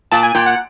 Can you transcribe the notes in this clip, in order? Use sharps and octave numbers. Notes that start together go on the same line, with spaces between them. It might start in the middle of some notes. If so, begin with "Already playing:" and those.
A#2 A5
G#5
A#2 G5
F#5